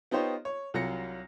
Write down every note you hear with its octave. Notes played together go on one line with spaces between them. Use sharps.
B3 D#4 F4 G4 C5 C#5
C#5
C2 F#3 F4 A#6 C#7